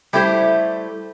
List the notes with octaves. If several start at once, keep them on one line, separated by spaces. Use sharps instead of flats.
G3 A3 E4 G4 C5